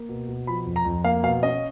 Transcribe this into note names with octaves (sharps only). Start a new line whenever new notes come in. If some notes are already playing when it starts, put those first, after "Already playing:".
Already playing: A#3
B2
B2
F3 B5
F2
A#5
F2
A#3 F5
B2 F5
C#4 D#5